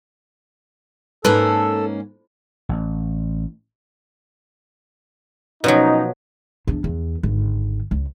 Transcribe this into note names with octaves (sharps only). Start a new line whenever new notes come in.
G#2 A#3 C#4 A4 B4 E6
A1
B2 F3 F#3 C#4 D#4
E2 D4
E2
G#1 D3
C#2